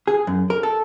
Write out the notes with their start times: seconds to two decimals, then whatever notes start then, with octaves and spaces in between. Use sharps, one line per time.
0.07 G#4
0.27 F#2
0.50 A#4
0.63 A4